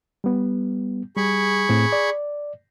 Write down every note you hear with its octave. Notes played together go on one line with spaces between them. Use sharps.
G3 B3
G3 G#4 B5 C#6
A2 C4
D5